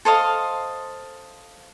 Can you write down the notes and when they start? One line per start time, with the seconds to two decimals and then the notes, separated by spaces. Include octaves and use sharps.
0.05 A4 C5 D#5 F5